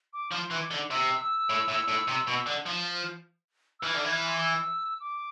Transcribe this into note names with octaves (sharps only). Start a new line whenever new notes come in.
D6
F3 C6
E3
D6
D3
C3 E6
E6
A2
A2
A2
C3
B2
D3
F3
E6
E3 F6
D3
E3 G#6
F6
C6
D6
E6
D6